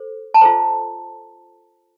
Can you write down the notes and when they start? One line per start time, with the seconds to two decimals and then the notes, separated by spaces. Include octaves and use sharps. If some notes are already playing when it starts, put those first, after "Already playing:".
Already playing: A4 C5
0.34 A5
0.41 F4 A4 C5 A#5